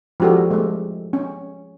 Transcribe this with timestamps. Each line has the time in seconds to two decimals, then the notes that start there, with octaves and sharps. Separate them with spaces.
0.20 F3 G#3 F#4 G4 A4
0.51 G#3 A3
1.13 C#4